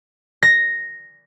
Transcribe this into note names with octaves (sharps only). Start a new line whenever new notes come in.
A#6